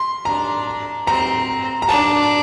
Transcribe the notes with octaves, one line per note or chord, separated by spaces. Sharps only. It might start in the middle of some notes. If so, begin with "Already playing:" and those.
Already playing: C6
D4 A#5
C4 A#5
A#5
D4 A5